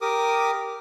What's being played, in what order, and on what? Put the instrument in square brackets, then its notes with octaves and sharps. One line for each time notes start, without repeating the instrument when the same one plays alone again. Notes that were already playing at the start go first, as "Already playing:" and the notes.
[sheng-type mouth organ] G4 A#4 D6 D#6